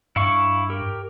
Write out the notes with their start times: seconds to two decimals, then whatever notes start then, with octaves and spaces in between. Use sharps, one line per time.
0.16 G2 E4 F5 C#6
0.70 G4 A#4